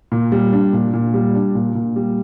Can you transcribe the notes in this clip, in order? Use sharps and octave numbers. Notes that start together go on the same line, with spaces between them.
A#2
G3
D4
A#2
A#2
G3
D4
A#2
A#2
G3